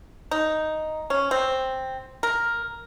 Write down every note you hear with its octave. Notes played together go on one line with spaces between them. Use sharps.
D#4
C#4
C4
A#4